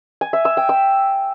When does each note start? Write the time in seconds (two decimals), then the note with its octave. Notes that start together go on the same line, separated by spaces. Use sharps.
0.21 G#5
0.33 E5
0.45 E6
0.57 G5
0.69 E6